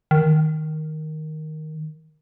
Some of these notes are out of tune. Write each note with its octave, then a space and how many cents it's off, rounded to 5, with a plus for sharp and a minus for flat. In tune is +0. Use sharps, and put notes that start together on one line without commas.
D#3 +0